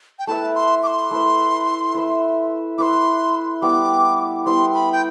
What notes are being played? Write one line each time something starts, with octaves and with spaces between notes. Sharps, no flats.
G5
A3 E4 B4 E5 A5
C6
D6
C6
A3 E4 B4 E5
E4 B4 E5
E4 B4 E5 C6 D6
G3 B3 E4 D6
G3 B3 E4 C6
B5
G5